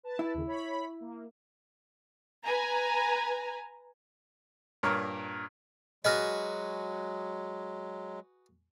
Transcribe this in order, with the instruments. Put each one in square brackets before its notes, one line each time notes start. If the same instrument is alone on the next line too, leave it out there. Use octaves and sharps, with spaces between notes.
[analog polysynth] B4 A5
[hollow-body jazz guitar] E4
[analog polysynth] D#2 C#3
C#5 B5 B6
A#3
[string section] B4 G#5 A#5
[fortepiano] G2 A#2 A#4 C#5 A#5
[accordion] F#3 G#3 [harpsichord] F#4 G#4 B4 [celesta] D#5 F6 A#6